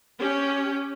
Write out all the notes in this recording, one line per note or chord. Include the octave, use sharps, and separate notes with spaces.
C#4 G4